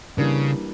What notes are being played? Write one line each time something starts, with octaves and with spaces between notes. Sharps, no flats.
C#3 E3 G3 A#3 D4